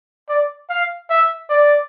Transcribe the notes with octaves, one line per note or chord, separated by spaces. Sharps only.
D5
F5
E5
D5